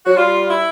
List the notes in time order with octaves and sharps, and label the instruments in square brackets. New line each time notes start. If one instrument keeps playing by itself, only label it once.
[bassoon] F#3 [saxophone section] F#4
[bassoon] G3 [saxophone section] F4
[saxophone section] E4